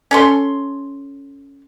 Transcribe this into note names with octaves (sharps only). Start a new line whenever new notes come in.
C#4 A4 C6